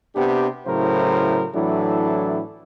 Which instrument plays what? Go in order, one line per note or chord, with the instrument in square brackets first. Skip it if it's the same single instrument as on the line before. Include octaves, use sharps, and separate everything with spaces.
[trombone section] C3 B3 D4 G4
A2 C#3 F#3 E4 A#4 C5
A2 E3 F#3 D4 E4 A4